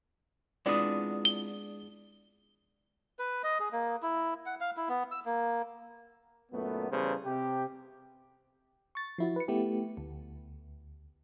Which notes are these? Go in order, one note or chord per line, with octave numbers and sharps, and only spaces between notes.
G#3 B3 C4 D4 E4 F4 D5 D#6
G7
B4
D#5
G#4
A#3
E4
F#5
F5
E4
B3
E6
A#3
F#2 A#2 A3 B3
E2 C#3 G3 A4 B4 C5
C3 G4
C#6 A6
F3 E4 F#4
B4 C#7
A3 B3 E4 G4
D2